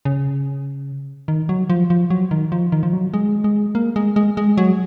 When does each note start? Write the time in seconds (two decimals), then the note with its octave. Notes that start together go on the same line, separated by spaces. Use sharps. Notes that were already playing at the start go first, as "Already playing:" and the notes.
0.05 C#3
1.28 D#3
1.49 F#3
1.70 F3
1.90 F3
2.10 F#3
2.31 D#3
2.52 F3
2.72 D#3
2.83 F3
2.93 F#3
3.14 G#3
3.44 G#3
3.75 A#3
3.96 G#3
4.16 G#3
4.37 G#3
4.57 F#3